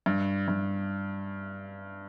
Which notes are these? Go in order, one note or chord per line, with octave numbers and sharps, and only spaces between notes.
G2
G2